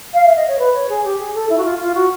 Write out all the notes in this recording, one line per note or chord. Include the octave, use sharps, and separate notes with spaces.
F5
E5
D#5
C#5
B4
C#5
G#4
G4
G#4
A4
E4
F#4
F4
F4
F#4